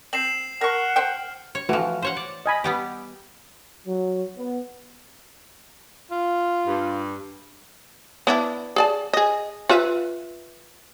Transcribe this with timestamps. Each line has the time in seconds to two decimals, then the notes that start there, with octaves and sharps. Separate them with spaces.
0.13 C4 C7 E7 F#7
0.61 A#4 F#5 C#6 F6
0.96 C5 G5
1.55 C#5
1.69 E3 F3 A3 F#4 B4
2.02 C5 C#5 F#5
2.17 D5
2.46 D#5 G#5 B5
2.64 G3 B3 G4
3.87 F#3
4.38 B3
6.11 F4
6.66 G2
8.27 B3 D4 E4
8.76 G#4 D5 A5
9.13 G#4 D#5
9.69 F4 B4 E5